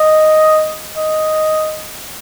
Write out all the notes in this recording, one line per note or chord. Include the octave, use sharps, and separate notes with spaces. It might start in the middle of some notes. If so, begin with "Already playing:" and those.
Already playing: D#5
D#5